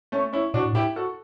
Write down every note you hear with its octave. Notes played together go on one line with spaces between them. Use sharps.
A3 C#4
C#4 E4
A2 D4 F#4
E4 G4
F#4 A4